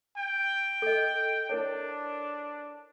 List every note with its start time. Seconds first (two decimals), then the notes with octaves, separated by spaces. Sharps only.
0.17 G5
0.82 A4 D#5
1.50 D4 E4 A#4 C#5